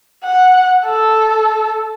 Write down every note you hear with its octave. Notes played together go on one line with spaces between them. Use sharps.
F#5
A4